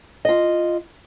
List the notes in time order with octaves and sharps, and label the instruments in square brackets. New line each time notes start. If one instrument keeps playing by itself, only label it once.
[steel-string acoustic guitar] F4 D#5